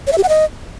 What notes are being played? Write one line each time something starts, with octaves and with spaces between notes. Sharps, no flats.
C#5
E5
G4
F#5
D#5